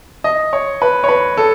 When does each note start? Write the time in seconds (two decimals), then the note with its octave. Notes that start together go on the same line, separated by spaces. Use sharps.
0.24 D#5
0.53 C#5
0.82 B4
1.04 C#5
1.09 B4
1.37 A4